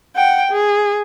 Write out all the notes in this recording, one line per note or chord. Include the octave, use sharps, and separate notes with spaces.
F#5 G5
G#4